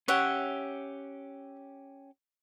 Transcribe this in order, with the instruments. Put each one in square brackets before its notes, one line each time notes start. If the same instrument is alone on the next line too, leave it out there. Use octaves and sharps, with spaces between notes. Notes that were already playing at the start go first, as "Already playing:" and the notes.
[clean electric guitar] C#4 G4 [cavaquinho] C#5 E5 F#5